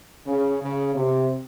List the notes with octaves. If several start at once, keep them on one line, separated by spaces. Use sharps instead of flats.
C#3
C#3
C3